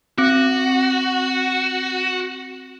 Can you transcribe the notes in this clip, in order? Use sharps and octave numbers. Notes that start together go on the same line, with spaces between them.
C4 F#4